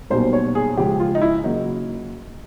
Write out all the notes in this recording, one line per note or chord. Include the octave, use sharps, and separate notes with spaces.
B1 B2 G3 A#3 C5
C#5
G#4
C#2 C#3 F3 G4
F4
D#4
E4
C#3 F#3 A#3 D#4